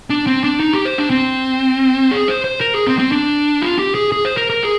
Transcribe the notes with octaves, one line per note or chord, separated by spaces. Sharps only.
D4
C4
D4
D#4
G4
C5
D4
C4
G#4
C5
C5
A#4
G#4
C4
C4
D4
F4
G4
G#4
G#4
C5
A#4
A#4
G#4